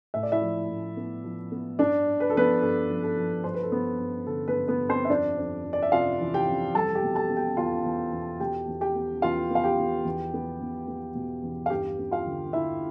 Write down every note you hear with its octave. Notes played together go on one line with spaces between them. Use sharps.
A2 E5
D5
E4 E5
F3
A2
B3
F3
B3
G2 D4 D5
G2
B4
A4
F3 B3 B4
G2 A4
F3
A4
F3
G2 C5
B4
A4
G2 B3 B4
G2
D3 A4
B3 B4
G2
B3 B4
G2
C4 C5
E5
F2 D4 D5
F2
F2
D5
E5
C3 F4 F5
E3
G4 G5
F2
G3 A4 A5
G4 G5
B2
A4 A5
B3
G4 G5
E2 F4 F5
E2
E2
B2 G4 G5
E2
G4 G5
B3
E2 F4 F5
B3 F5
G4 G5
E2
E2
B3
E2
B3
B2
E2
F5
G2 G4 G5
B3
F4 F5
D3
D3 E4 E5